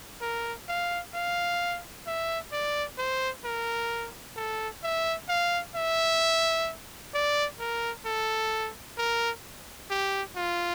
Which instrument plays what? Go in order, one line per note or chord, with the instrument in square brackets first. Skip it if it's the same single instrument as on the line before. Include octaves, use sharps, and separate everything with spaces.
[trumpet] A#4
F5
F5
E5
D5
C5
A#4
A4
E5
F5
E5
D5
A#4
A4
A#4
G4
F4